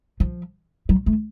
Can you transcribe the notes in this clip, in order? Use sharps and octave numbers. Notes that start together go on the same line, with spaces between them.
F3
F#3
A3